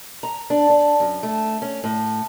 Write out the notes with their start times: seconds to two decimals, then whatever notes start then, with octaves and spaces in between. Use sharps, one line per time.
0.23 A#5
0.50 D4
0.70 D4
1.00 F#2
1.23 A3
1.62 C#4
1.84 A2